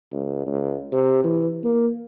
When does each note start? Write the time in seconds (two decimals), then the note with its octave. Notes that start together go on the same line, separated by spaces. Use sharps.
0.12 C#2
0.46 C#2
0.92 C3
1.24 E3
1.64 A#3